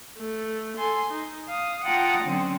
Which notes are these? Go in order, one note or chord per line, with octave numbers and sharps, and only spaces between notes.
A3
A4 G#5 C6
D#4
F5 D#6
F4 F#5 G5 A5 A#5 D#6
D3 F#3 C4 C#4